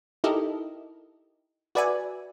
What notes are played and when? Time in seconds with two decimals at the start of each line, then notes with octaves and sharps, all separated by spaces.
0.24 D#4 E4 G4 A4 A#4 D#5
1.75 F#4 B4 D5 E5 G#5